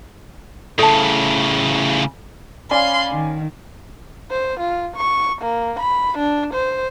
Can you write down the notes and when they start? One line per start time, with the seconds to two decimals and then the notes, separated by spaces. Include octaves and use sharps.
0.79 A2 C#3 A4 A5
2.71 C#4 D5 F5 G#5 B5 C6
3.09 D#3
4.31 C5
4.60 F4
4.96 C#6
5.42 A#3
5.79 B5
6.18 D4
6.54 C5